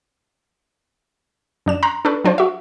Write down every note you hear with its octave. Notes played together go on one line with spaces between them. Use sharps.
F#2 D4 E7
A#5 C6 F#6
D4 A4 B4 C#6
F#3 D4 F4 C5
F#4 E5